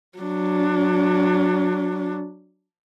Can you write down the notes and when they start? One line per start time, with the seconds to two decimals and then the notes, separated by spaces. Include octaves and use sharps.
0.18 F#3 D4